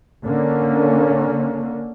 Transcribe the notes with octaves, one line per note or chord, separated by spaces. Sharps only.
D3 A#3 C#4